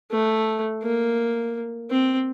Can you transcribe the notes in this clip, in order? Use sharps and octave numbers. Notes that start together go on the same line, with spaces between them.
A3
A#3
C4